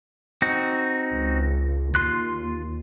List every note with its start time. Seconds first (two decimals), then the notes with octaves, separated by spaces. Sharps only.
0.42 C4 D#4 F#4
1.13 C#2
1.95 D#2 F4 C6 F#6